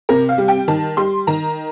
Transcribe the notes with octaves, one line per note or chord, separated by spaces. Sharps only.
C3 A#4
F5
G3
G5
D#3 A5
G3 C6
D#3 A#5